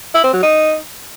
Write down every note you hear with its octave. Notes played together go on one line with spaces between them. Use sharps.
E4
C4
F#3
D#4